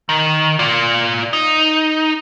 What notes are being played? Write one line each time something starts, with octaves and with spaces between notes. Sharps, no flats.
D#3
F4 D5
D#4